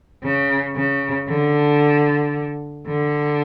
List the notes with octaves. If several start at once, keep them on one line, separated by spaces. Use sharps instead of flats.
C#3
C#3
D3
D3